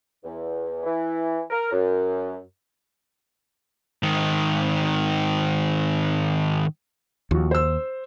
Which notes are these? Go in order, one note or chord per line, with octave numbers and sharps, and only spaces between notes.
E2
E3
A#4
F#2
G#2 D#3
D#2 F3 F#4
C5 E6